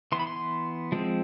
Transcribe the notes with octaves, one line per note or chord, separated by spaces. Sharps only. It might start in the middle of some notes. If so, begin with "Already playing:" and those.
E3 B3 C6
B5
C6
F3 G#3 C4